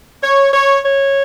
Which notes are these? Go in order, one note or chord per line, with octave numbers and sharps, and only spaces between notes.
C#5
C#5
C#5